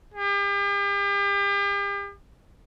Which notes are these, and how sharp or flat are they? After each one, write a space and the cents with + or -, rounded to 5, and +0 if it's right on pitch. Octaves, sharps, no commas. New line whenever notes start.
G4 +40